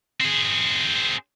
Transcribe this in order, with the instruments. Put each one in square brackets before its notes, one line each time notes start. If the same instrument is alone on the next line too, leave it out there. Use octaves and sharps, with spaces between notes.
[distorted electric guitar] C4 G#4